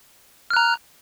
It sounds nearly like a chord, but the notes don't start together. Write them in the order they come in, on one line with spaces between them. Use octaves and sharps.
F6 F#6 A#5